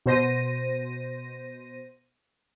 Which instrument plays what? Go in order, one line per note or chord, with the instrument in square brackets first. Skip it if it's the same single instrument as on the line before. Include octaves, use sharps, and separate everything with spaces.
[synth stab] B2 C5 A#6 D#7